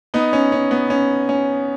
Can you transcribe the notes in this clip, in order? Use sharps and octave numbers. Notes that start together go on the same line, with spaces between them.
B3 D#4
C#4
C#4
B3
C#4
C#4